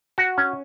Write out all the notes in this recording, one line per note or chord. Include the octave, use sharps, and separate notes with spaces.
F#4
C#4